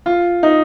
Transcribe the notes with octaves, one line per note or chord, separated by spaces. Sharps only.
F4
D#4